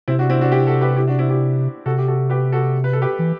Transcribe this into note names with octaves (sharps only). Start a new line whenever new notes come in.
C3 C4 E4
D4 F#4
C4 E4
D4 F#4
E4 G4
F#4 A4
G4 B4
E4 G4
D4 F#4
C4 E4
E4 G4
C3 F#4 A4
G4
F#4 A4
G4 B4
F#4 A4
B4
A4
G4 B4
E3